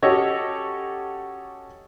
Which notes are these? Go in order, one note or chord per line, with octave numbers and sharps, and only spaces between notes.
C#4 F#4 G4 A4 C#5 D#5